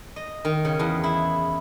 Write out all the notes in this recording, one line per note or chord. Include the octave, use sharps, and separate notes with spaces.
D#5
D#3
C#3
E2
E4